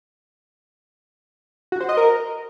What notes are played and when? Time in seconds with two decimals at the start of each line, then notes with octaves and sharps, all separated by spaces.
1.72 F#4
1.80 C5
1.89 D#5
1.97 A#4